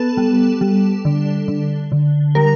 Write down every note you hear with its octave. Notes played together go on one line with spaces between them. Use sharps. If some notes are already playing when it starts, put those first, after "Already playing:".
Already playing: B3 A4
G3
G3
D3
D3
D3
G3 A#4